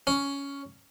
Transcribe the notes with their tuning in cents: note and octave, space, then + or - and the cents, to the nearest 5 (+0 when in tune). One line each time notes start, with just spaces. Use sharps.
C#4 +10